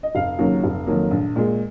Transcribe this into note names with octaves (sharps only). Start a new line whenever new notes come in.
D#5
F1 F5
D#2 C#3 F#3 A#3
F1
F2 D#3 F#3 A#3
A#1
A#2 G#3